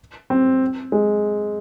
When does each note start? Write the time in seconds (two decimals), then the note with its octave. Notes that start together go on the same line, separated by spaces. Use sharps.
0.30 C4
0.92 G#3